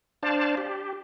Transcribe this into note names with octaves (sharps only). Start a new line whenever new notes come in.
D4 C5 D5 F5 A5
G4